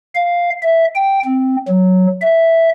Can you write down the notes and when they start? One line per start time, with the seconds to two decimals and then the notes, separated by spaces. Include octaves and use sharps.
0.15 F5
0.63 E5
0.95 G5
1.25 C4
1.68 F#3
2.22 E5